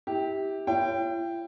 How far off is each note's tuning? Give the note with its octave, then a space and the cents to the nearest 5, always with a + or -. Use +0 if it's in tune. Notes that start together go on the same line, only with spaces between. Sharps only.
E4 -25 G4 +0
E4 +45 C#5 +0 G5 +0